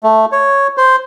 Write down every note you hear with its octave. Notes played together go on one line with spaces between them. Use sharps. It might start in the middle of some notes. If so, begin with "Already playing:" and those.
A3
C#5
C5